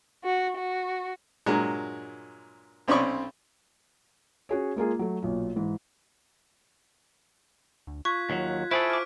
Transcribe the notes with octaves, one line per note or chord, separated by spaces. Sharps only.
F#4
F#4
G2 A#2 F#3 G#3
B1 C4 C#4 D5 B5 C#6
C#4 F#4 G#4 C#5
G#3 A#3 F4 G#4
F#3 A3
B1 A#2
G#2 E3
D2
F4 C#6 F#6 G#6 B6
D#2 F#3
E4 G#4 A4 C5 C#6 G#6 D7
C5 D6 F6